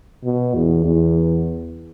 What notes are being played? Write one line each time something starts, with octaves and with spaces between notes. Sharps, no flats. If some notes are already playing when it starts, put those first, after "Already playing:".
B2
E2
E2